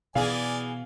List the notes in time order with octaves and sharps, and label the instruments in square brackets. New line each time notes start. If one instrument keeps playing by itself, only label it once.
[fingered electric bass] B2 B3 [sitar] E3 G#4 [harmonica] D5 G#5 [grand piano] F5